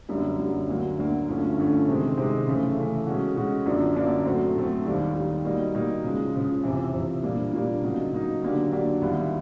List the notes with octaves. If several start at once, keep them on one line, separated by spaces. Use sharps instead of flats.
F#2 D3 G3 A#3
F#2 D3 G3 A#3
D2 D3 F#3 A#3
D2 D3 F#3 A#3
G2 D3 F3 A3 C#4
G2 D3 F3 A3 C#4
C3 D#3 G#3 C4
C3 D#3 G#3 C4
C#3 E3 A3
C#3 E3 A3
B2 G#3 C#4 F#4
B2 G#3 C#4 F#4
F#2 D3 F3 A#3 D4
F#2 D3 F3 A#3 D4
B2 F#3 A3 C4
B2 F#3 A3 C4
D#2 D#3 G3
D#2 D#3 G3
B2 G3 A#3 D#4
B2 G3 A#3 D#4
C#3 F3 G#3
C#3 F3 G#3
F2 C3 E3
F2 C3 E3
A#2 G3 A#3 D4
A#2 G3 A#3 D4
C#3 F#3 A#3 D#4
C#3 F#3 A#3 D#4
D3 F#3 A#3 D4 G4
D3 F#3 A#3 D4 G4
D#2 D#3 G3 B3 E4